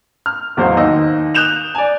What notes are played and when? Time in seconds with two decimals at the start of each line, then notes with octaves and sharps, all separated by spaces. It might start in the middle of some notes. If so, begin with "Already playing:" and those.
0.26 F6
0.57 A1 E2 F#3 C5 F5
0.77 D#2 D#4 D#5 E6
1.35 D#6 F#6 G6 E7 F7
1.75 D5 G#5